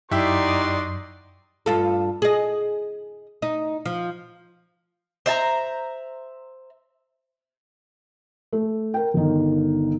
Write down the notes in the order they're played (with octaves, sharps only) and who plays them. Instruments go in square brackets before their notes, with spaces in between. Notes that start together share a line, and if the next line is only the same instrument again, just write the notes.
[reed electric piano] F#2 [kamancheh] D#4 D5 [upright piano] E4 G4 [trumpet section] F#4 D#5 C6
[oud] G2 F4 A4
G#4 D#5
D#4
F3
[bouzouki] C5 E5 A5 A#5
[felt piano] A3
A#4 G5
G1 D#3